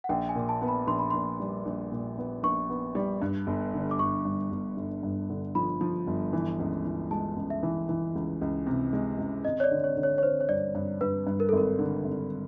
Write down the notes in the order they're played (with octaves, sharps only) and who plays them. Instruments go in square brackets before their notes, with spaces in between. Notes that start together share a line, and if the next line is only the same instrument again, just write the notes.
[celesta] F#5
[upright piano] A#1 [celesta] G5
[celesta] G#5
[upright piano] A#2
[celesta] A5
[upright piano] B3
[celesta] B5
[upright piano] A#1 [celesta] C6
[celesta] B5
[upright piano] A#1 [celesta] C6
[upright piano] G3
A#1
A#2
B3
[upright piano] A#1 [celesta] C#6
[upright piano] B3
G3
G2
G1
D3
[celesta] D6
[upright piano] G1 [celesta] C#6
[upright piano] G2
G1
G1
G2
D3
[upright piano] F3 [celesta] B5
[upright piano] F3
G1
E3
C#2
E3
[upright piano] G#3 [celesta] A5
[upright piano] C#2
[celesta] E5
[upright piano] E3
E3
C#2
C#2
C3
G#3
C#2
[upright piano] G#1 [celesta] D#5
[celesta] C#5
D5
[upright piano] D3
[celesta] C#5
[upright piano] D3
[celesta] C#5
C#5
[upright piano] D3 [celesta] C5
[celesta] C#5
[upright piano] G2 [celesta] D5
[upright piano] G2
[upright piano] G2 [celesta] B4
[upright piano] G2
[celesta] A#4
A4
[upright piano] G#1 [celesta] A#4
[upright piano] D3
G#1